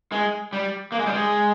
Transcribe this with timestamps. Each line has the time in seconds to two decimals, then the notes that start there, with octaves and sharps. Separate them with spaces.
0.12 G#3
0.53 G3
0.92 A#3
0.99 G#3
1.06 G3
1.14 G#3